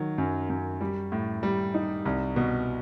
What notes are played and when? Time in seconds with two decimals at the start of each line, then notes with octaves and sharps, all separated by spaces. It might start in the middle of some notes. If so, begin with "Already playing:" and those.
Already playing: D#3 F#3
0.18 F#2
0.50 F#2
0.81 G3
1.12 A2
1.43 G3
1.74 D#4
2.05 C2
2.36 B2